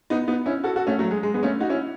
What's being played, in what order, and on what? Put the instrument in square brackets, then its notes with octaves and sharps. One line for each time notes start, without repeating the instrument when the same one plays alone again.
[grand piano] B3 D#4
B3 D#4
C#4 E4
F#4 A4
F#4 A4
A3 C#4
F#3 A3
G#3
G#3
G#3 B3
A3 C#4
D#4 F#4
C#4 E4